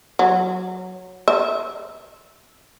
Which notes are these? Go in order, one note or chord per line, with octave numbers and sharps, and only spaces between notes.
F#3
E5